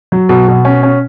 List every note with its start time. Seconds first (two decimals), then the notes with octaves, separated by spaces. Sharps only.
0.12 F#3
0.29 B2
0.48 B2
0.65 C#4
0.83 C#4